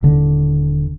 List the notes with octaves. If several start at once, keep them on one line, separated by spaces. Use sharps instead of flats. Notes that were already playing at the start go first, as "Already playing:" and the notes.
D#1 D3